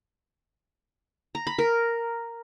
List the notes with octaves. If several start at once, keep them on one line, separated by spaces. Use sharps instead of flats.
A#5
B5
A#4